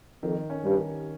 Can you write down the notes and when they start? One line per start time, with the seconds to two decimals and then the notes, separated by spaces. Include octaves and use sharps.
0.23 F2 D#3
0.50 C#4
0.64 G2
0.77 D#3